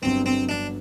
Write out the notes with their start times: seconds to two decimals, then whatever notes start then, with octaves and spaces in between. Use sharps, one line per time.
0.02 G1 G2 D3 F#3 B3 C4
0.26 C4
0.49 D4